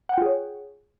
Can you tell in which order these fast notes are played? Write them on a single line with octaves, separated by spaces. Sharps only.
F#5 G5 F4 G#4 C#5